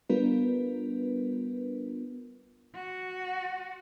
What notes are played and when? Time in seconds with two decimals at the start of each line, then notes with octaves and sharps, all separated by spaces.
0.09 G3 B3 D4 F4 A#4 B4
2.75 F#4